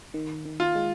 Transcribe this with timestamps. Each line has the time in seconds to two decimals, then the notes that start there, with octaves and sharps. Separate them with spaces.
0.14 D#3
0.45 D#3
0.60 F4
0.76 G#3